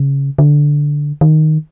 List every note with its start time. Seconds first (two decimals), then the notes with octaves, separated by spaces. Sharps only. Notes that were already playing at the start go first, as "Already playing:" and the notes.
Already playing: C#3
0.39 D3
1.21 D#3